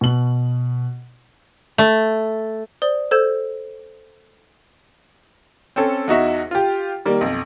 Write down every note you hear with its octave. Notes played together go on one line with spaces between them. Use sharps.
B2 F#7
A3
C5 D5 D#6 G7
A4 C5 E6 G6 G#6 E7
C4 C#4 A4
E2 D#4 F#4 E5
F4 G4
D#3 G3 A#3
B1 F2